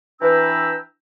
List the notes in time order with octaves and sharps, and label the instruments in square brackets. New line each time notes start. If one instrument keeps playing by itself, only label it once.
[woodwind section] E3 D4 B4 G5 A#5 E6